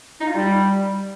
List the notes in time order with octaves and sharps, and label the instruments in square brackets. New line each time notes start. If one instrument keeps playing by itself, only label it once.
[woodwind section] D#4
F4
G3